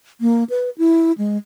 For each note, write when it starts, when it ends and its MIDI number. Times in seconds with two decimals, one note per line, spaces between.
0.21 0.44 58
0.50 0.70 71
0.78 1.12 64
1.18 1.37 56